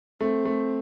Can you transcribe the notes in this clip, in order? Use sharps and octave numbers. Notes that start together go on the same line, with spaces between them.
A3 C4
A3